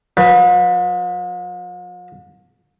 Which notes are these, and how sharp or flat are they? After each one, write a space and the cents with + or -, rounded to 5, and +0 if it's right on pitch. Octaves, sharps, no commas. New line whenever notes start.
F3 +45 B4 -5